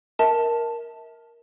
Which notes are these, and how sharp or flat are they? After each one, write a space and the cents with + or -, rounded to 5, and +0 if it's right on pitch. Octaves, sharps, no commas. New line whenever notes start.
A#4 +5 E5 -40 A5 +0